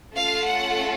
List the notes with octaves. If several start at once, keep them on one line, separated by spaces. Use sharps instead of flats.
A3 C#4 F4 A4 F5
F#5